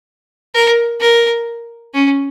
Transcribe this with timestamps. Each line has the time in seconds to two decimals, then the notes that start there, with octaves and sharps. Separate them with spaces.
0.55 A#4
1.00 A#4
1.94 C#4